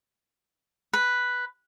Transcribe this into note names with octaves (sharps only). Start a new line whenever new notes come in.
B4